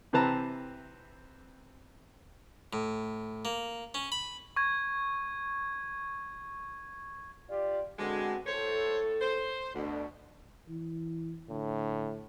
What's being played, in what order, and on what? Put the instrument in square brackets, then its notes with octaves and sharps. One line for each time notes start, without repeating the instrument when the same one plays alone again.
[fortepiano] C3 E3 C4 B4 A5 A#5
[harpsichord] A2
A#3
C#4
B5
[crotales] C#6 G#6
[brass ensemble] F4 G4 D5
[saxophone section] D3 G#3 [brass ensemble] B3 C4 F#4
[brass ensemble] A2 A4 [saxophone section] C5 C#5
[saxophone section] C5
[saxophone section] D2 [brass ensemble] B2 D3
[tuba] E3
[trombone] A2 [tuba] D3